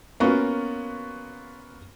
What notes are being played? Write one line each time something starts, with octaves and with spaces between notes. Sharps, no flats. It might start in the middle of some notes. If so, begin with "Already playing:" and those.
A#3 B3 C#4 F4 F#4